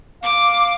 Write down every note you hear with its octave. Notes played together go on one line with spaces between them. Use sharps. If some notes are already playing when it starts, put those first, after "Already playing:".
F5 D6